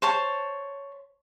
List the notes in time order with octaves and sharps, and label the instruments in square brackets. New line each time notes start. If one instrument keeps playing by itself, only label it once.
[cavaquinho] C5 C#5 A5